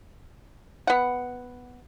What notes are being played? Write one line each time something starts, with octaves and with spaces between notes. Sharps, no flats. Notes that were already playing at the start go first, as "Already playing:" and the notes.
B3 F#5